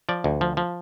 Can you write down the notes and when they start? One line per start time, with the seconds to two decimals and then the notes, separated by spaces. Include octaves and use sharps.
0.09 F3 D5
0.24 D2
0.41 F3
0.57 F3